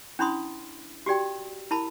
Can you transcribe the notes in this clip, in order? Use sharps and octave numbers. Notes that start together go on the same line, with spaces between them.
C#4 D4 E4 B5 C6 D#6
F#4 G4 D5 G5
E4 A#4 A5 B5